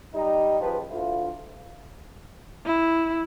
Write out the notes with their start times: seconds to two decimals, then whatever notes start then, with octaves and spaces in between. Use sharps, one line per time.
0.14 G3 D#4
0.61 C#2 F3 D#4 G4 B4
0.90 D2 E4 F4
2.66 E4